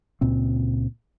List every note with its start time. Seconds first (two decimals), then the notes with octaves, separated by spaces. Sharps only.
0.21 C#2 A#2 C4